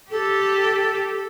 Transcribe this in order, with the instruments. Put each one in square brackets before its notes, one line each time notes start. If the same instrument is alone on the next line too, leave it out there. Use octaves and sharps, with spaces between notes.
[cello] G4 [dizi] A4